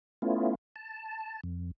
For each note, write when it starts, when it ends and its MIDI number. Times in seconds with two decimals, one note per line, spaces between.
0.22 0.55 57
0.22 0.55 59
0.22 0.55 61
0.22 0.55 64
0.22 0.55 65
0.76 1.41 81
1.44 1.71 41